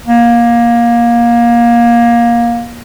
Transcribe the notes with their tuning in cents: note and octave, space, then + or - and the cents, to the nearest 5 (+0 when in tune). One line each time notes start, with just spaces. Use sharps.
A#3 +20